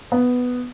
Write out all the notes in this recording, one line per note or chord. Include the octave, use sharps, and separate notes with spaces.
B3